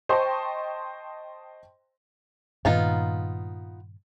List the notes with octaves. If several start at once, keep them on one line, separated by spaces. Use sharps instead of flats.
C5 D#5 G5 A5 C6 C#6
G2 A#2 D#3 B3 D#4 F4